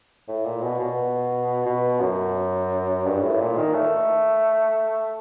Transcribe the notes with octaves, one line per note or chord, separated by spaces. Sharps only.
A2
A#2
B2
B2
B2
F#2
G2
A2
A#2
D#3
A3